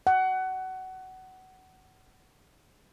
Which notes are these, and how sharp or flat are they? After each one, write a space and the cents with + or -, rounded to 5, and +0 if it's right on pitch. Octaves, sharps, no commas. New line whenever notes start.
F#5 +20